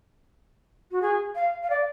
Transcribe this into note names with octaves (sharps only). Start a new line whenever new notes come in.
F#4
G#4
F5
F5
D5